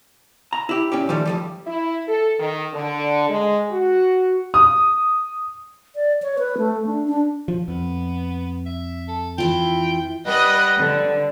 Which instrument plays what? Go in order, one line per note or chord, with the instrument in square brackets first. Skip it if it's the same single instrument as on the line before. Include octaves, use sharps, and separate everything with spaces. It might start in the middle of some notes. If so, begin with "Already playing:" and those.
[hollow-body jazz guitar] A#5
E4 G4
A#2 C#4 G4
D#3 F3 G3 A3
G2 F3 G3
[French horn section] E4
A4
D#3
D3
G#3
F#4
[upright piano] D#6
[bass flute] D5
C#5
B4
A3
D4
D4
[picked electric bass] F3
[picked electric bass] F2 [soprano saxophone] B3
[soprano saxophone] E5
A4
[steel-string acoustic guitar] E3 E4 F4 [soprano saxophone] G5
[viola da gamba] G3 [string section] B4 D#5 [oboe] F#5
[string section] D3